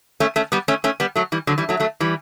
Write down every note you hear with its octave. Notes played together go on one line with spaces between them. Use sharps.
A3 C#4
A3 C#4
G3 B3
A3 C#4
A3 C#4
G3 B3
F#3 A3
E3 G3
D3 F#3
E3 G3
F#3 A3
F#3 A3
E3 G3